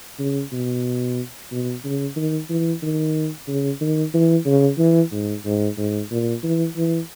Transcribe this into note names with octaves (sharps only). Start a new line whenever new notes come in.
C#3
B2
B2
C#3
D#3
E3
D#3
C#3
D#3
E3
C#3
E3
G#2
G#2
G#2
A#2
E3
E3